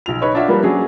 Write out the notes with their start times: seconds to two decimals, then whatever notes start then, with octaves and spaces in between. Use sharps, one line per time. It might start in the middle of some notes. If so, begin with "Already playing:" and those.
0.06 B1 F3 F7
0.21 D#4 B4 C#5 D#5
0.35 D4 F4 E5 F#5
0.48 F3 G3 A#3 A#4 B4
0.63 F#3 C#4 D4 G#4